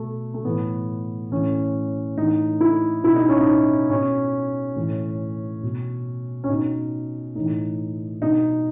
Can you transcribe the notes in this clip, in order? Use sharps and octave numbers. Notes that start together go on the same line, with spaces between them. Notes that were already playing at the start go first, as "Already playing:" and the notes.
Already playing: B2 A3
A3
A2 E3 B3
A2 E3 C#4
A2 E3 D#4
E4
B2 E4
D#4
C#4
D#4
B2 C#4
A2 E3
B2
C#4
B2 D#4
A2 E3 D#4
B2 D#4